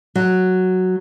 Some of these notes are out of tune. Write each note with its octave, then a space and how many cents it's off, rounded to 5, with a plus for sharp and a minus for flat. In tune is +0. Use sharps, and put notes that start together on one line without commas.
F#3 +0